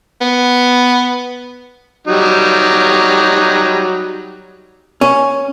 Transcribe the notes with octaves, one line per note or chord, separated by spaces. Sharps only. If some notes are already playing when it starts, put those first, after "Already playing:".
B3
F#3 G3 D#4
C#4